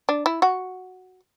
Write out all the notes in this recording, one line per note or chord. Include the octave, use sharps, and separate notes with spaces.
D4
E4
F#4